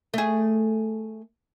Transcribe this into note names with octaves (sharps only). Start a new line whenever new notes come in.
A3 G#4